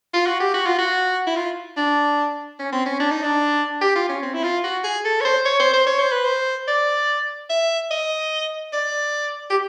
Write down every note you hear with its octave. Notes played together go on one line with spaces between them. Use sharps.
F4
F#4
G4
F#4
F4
F#4
E4
F4
D4
C#4
C4
C#4
D4
D#4
D4
G4
F4
C#4
C4
E4
F4
F#4
G#4
A4
C#5
C5
C#5
C5
C5
C#5
C5
B4
C5
D5
E5
D#5
D5
G4